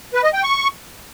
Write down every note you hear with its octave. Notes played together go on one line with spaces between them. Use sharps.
B4
D#5
G5
C#6